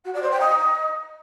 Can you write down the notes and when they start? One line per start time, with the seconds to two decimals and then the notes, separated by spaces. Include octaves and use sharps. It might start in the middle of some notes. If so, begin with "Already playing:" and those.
0.04 F#4
0.13 D5
0.22 C5
0.31 G5
0.40 D#5